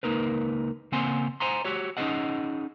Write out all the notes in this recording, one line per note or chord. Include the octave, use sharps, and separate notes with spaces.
C#2 A#3 D#4 A#4 B4
C#3 A#3 C4 F#5 G#5 C6
C5 F#5 G#5 A#5 C6
F#4 G4 C#5
C#4 D#4 F#4 G#4 D#5 F#5